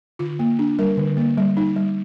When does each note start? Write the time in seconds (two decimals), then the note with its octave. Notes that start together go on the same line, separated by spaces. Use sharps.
0.19 D3 F4
0.39 A#3
0.59 D4
0.79 G3 A#4
0.97 D3
1.17 A#3
1.38 G3
1.57 D#4
1.76 G3